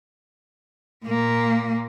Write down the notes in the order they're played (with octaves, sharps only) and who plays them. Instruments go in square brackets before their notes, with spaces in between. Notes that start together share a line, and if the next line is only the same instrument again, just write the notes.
[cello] A#2 A#3